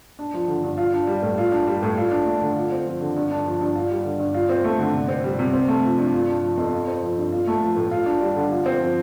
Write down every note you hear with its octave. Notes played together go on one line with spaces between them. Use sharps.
D4
F3
D3
G2
F4
D4
G3
A2
F4
D4
G3
A2
F4
D4
A3
D3
F4
C4
F3
D3
G2
D4
F3
G2
F4
G3
D3
G2
F4
C4
A3
D3
C3
C4
G3
C3
C4
A3
F3
G2
F4
D4
F3
F2
F4
C4
F3
G2
F4
A3
F3
A2
F4
D4
G3
D3
F4
C4
F3